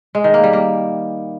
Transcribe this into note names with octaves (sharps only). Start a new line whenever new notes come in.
G#3
D#3
A#3
G3
A#3